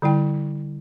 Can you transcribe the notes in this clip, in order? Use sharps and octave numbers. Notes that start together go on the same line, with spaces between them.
D3 G3 E4 G5